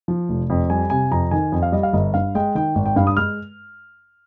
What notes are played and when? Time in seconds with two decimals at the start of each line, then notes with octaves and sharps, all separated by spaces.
0.08 F3
0.29 F1
0.50 F2
0.70 G3 G#5
0.90 C3 G#5
1.11 F2 A#5
1.31 D#3 G#5
1.52 F2
1.62 F5
1.72 G3 D#5
1.83 F5
1.93 G1 D#5
2.14 G2 F5
2.35 G#3 G5
2.55 D#3 G5
2.75 G#1
2.86 G5
2.96 G2 F5
3.07 D#6
3.17 G#3 F6